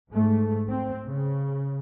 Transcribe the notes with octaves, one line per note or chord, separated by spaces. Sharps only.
G#2 A3
C4
C#3